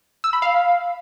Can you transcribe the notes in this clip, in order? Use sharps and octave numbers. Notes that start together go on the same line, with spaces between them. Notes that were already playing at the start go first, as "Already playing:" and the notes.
E6
B5
F5